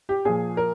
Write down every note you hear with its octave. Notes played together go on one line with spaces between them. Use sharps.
G4
A#2 F3 G#4
A#4